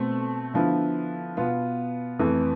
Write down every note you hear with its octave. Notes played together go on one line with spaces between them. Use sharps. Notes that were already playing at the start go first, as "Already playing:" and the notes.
Already playing: B2 A3 C4
D3 F3 B3 E4
B2 B3 F4
F2 E3 A3